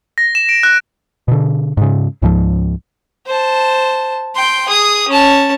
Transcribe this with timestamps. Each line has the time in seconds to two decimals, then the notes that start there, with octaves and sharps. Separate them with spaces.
0.18 A#6
0.35 E7
0.49 D7
0.63 F#6
1.28 B2 D3
1.77 G#2 C#3
2.22 C#2 G#2 F3
3.27 C5 A5
4.35 G5 C6
4.69 G#4 D#6
5.08 C#4 A5